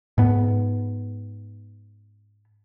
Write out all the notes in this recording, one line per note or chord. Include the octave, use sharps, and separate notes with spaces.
G#2 B3